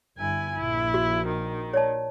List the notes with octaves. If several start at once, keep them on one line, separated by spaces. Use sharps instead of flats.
G1 E4 G#5
A#1 E4
F#4
D#3
C#5 D5 A5